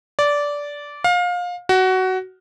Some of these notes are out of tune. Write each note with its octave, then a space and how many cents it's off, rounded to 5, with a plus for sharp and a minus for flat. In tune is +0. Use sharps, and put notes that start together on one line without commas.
D5 -15
F5 +25
F#4 +15